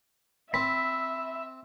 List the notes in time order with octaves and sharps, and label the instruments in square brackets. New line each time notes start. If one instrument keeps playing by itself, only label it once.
[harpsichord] C4 [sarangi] E5 [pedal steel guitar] B5